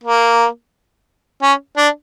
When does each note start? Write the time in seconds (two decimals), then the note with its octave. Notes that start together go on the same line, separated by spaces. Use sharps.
0.04 A#3
1.42 C#4
1.77 D4